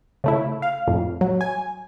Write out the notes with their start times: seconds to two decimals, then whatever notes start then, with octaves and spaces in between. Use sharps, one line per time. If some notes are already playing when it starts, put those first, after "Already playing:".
0.24 C#3 A3 E4
0.62 F5
0.87 F2 A2
1.21 F#3
1.41 G#5